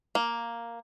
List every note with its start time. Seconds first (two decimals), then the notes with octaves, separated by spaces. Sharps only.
0.15 A#3